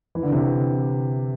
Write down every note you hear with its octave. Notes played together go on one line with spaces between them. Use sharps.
E3
D3
C3 E3